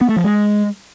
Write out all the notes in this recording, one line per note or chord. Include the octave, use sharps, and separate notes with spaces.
B3
A3
F3
G#3